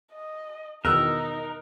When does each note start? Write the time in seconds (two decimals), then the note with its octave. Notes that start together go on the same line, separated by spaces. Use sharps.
0.13 D#5
0.85 E2 B2 D#3 D#4 A#4 E6 F#6